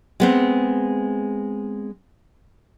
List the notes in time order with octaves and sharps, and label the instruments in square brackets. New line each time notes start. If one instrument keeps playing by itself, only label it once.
[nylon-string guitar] G#3 B3 C4